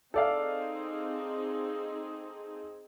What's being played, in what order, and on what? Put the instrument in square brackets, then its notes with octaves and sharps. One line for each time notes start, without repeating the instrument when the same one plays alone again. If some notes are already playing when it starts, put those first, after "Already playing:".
[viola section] C4 D#4 G#4 [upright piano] A4 D5 F5